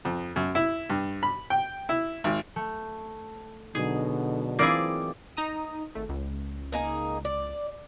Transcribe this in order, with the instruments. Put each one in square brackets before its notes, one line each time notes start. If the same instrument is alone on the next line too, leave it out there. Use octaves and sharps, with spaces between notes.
[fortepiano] F2
F#2
E4
G2
B5
G5
E4
G#1
[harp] A3
[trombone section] B2 D3 [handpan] F#3 D#4 [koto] G#4
[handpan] E3 C4 F4 [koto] A#3 E4 G#4 [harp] D5
[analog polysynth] D#4 A#5 D#6
G#1 A3
C#2
[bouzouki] A#3 D#4 G#4
D5